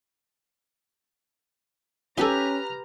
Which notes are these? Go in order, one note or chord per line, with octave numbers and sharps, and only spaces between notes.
C#4 D#4 G4 A4 B4 G#5 A#5 F6